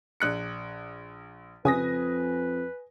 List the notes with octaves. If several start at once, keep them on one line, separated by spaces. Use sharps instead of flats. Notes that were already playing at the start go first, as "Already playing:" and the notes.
A#1 F#6 C#7
F2 C#3 B4 G#5 D#6 A#6